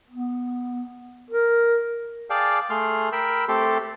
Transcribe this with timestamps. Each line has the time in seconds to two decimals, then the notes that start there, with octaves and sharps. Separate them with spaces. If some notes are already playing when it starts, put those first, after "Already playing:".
0.10 B3
1.30 A#4
2.30 G#4 D5 F5 G5 A5
2.70 A3 G#4 C6 F6
3.12 A#4 G5 B5 E6
3.48 A3 C4 G4 A4 C6